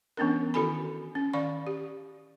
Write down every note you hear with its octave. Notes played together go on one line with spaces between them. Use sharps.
E3 B3 C#4 D4 A#4
D#3 E4 F#4 A4 G#5 B5
C#4
D#3 D5 F5 C#6
G4